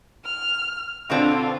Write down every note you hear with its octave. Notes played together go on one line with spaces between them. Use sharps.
F6
B2 D3 C4 D4 F4